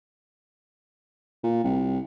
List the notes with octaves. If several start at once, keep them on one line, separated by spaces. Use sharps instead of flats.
A#2
C2